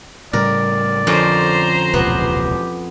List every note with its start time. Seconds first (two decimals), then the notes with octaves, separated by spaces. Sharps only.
0.33 A2 C#3 G3 A#4 D5
1.07 F2 D3 C#4 C5 F5 A#5
1.94 E1 C#2 A#2 B3 G4